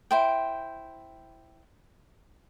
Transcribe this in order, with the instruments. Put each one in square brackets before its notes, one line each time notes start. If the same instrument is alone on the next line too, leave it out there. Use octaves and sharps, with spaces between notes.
[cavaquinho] E4 C5 G5